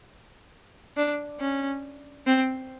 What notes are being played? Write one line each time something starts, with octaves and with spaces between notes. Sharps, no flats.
D4
C#4
C4